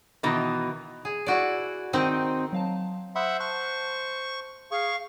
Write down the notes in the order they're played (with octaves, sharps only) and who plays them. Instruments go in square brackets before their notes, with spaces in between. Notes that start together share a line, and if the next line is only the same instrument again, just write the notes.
[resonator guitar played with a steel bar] B2 D#3 E3 D#4
[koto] G#4
E4 F#4 D5
D#3 C4 D#4
[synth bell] F#3 F5 A5
[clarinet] C5 [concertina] E5 F#5 [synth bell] B5 C6 D#6
[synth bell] A5 C6 F#6 [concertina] C#6
[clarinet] G#4 [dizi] F5 [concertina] C#6